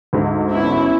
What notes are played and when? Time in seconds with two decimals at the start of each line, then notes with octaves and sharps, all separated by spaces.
0.13 D2 G#2
0.52 B3 C#4 E4